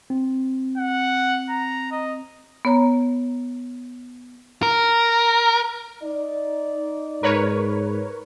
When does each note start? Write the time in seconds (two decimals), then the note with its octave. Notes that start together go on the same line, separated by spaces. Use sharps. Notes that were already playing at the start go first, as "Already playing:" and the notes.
0.10 C4
0.77 F#5
1.49 A#5
1.92 D#5
2.65 B3 C#5 A#5
4.63 A#4
6.03 D#4 D5
7.23 G#2 A#4 B4 C#5